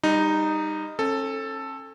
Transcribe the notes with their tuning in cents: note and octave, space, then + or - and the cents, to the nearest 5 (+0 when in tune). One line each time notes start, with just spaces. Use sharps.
G3 +25 D#4 -5
C#4 -45 A4 +5